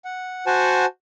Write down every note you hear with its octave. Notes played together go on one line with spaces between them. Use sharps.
F#5
F#4 C5 F#5 G#5 A5